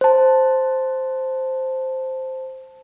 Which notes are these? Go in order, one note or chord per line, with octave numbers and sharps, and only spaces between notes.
C5 A5